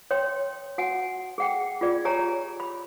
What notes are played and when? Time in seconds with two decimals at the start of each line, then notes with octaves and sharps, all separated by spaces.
0.11 C#5 G5 C6
0.78 F#4 F#5 G#5
1.38 G#4 F#5 G5
1.81 F4 G#4 D5
2.05 G4 C#5 G#5 A#5
2.60 B5